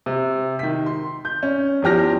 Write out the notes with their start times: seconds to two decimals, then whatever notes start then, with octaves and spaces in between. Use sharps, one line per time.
0.06 C3
0.59 D#3 B6
0.86 C6
1.25 G6
1.43 C#4
1.82 E2 E3 F3 G4 F6 A#6